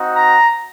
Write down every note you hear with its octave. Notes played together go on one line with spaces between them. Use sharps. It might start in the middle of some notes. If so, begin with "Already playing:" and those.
Already playing: C4 D#4 F#4
A#5